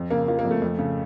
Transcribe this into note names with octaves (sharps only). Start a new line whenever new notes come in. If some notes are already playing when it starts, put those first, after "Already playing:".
Already playing: F2
C#3 A#3
F3 A#3
A#3
F2
A3
F2
C#3